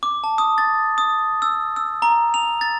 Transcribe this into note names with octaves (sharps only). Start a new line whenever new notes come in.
D6
A5
D#6
A6
D#6
E6
E6
A#5
F7
A6